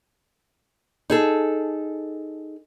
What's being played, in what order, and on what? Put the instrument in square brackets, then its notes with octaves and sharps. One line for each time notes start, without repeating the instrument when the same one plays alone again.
[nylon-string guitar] D#4 G#4 A4